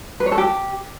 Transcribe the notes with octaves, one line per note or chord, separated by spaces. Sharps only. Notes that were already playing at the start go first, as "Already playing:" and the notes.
B4
C#5
A4
G4